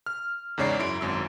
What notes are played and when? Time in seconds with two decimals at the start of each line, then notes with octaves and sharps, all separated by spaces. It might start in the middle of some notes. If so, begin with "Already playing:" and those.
0.06 F6
0.58 E2 G#2 C#3 C#5 D5 C7
0.79 F#2 E4 D7
1.01 G#1 F#2 E6